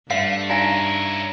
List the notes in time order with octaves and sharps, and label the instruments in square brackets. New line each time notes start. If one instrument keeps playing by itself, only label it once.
[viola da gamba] G2 [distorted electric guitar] A3 [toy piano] E5 F5 [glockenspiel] C7
[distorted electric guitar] C#4 E4 [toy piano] D#4 F5 G#5 [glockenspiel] A#5 A#6